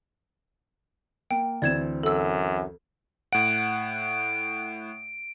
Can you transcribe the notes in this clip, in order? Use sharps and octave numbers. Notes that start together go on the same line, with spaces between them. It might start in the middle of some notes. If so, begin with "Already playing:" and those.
A#3 G5
D2 E3 C4 D5 G#6 E7
F#2 A4 E6
A2 F#5 D7